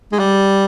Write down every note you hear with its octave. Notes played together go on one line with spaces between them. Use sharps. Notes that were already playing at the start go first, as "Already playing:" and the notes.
G#3
G3